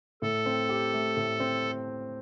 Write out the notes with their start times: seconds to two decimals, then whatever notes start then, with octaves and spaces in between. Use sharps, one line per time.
0.22 A2 A4
0.46 C4
0.69 G4
0.94 A3
1.17 A2
1.40 C4